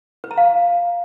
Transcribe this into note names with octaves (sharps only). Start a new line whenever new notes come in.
B4
A#5
F5